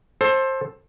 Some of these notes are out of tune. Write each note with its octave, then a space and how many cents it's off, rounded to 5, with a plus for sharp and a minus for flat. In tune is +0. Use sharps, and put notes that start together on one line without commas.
A4 +0 C5 +20